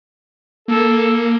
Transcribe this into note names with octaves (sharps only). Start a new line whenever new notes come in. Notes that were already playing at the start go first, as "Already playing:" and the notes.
A#3 A4